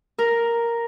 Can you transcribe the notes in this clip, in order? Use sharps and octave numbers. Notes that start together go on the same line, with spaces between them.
A#4